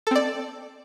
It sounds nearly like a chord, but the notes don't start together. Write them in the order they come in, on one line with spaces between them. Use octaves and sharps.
A4 C4 D5